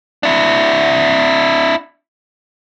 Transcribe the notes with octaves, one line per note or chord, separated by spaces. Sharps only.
D4 E4